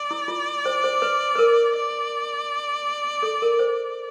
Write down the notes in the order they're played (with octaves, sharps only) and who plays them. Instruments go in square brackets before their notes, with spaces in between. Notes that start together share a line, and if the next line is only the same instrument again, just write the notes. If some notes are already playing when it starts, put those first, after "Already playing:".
Already playing: [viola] D5
[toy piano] E4
F4
C5
C5
B4
B4
A#4
[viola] D5
[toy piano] A4
A#4
C5